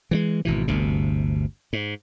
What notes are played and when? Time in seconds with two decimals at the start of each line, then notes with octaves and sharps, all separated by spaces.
0.11 E3 F3 G#3
0.45 G#1 B2 E3
0.68 G1 D2 C3
1.73 G#2